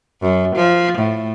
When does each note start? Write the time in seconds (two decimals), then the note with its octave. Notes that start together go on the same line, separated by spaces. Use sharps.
0.22 F#2
0.56 F3
0.98 A2